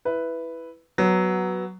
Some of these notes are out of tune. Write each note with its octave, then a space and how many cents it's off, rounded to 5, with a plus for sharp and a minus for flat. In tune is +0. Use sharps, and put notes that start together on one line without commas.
E4 +0 B4 +0
F#3 +5 B3 +0